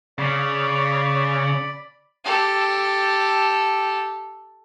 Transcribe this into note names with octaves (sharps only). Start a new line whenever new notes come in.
C#3 D5 B5
G4 A4